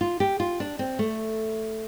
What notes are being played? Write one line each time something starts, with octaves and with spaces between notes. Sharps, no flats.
F4
G4
F4
D4
C4
A3